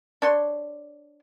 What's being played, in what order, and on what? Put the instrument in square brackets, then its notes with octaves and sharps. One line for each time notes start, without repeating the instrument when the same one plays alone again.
[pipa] D4 C#5 C6